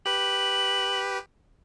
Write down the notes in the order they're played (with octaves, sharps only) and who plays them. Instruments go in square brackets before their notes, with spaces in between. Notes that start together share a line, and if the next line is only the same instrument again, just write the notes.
[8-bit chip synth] G4 B4 [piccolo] F#7